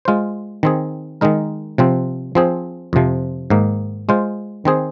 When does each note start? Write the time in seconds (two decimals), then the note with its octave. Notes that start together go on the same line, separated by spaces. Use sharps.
0.05 G#3 F4 C5
0.63 D#3 C4 G#4
1.21 D#3 G#3 D#4 A#4
1.78 C3 F3 C4
2.35 F3 C4 G#4 C5
2.93 F2 C3 F3
3.50 G#2 D#3 A#3
4.09 G#3 F4 C5
4.65 D#3 C4 G#4 C5